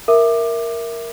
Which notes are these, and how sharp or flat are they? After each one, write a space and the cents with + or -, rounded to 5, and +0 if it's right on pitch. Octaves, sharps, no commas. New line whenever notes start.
A#4 +0 E5 +0 D6 +20